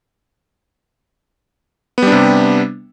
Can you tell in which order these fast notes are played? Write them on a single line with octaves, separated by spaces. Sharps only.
B3 G3 D4 C3